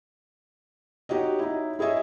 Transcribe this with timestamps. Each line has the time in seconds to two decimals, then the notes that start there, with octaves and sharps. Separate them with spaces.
1.09 D#4 F#4 G4 C#5 D#5
1.39 D#4 E4
1.79 E4 G#4 C#5 D#5 E5